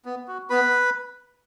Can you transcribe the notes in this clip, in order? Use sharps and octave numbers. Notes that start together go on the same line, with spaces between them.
B3
F#4
B3 B4 B5